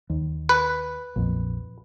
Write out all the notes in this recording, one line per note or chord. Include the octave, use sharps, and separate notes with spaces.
D#2
B4
A#1 F2